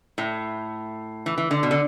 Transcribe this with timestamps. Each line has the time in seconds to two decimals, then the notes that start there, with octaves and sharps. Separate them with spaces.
0.18 A2
1.26 E3
1.38 E3
1.51 D3
1.63 B2
1.71 D3